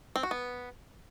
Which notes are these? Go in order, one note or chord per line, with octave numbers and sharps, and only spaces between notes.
C4
F#4
B3